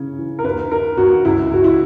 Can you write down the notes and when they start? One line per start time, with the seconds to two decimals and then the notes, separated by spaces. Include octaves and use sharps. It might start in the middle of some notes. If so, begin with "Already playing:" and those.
Already playing: C#3 E3 C#4
0.19 E3
0.39 A#4
0.44 D#2 B4
0.71 D#3 A#4
0.97 D#2 F#4
1.25 C#2 E4
1.51 C#2 F#4
1.64 E4